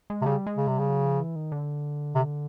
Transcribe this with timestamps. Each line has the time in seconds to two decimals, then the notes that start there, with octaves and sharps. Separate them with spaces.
0.10 G#3
0.22 C3
0.26 C#3 G3
0.47 G#3
0.57 C#3
0.68 C3 G3
0.79 C#3
0.89 F#3
1.05 F3
1.20 E3
1.36 D#3
1.52 D3
2.15 C3